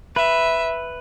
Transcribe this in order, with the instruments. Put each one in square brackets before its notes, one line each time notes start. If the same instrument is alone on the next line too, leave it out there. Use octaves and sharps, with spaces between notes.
[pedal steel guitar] B4 [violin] E5